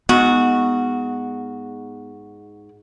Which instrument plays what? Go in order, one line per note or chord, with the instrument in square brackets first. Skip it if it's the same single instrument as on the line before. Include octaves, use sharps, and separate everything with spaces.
[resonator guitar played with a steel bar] G#2 F#4 [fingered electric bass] B3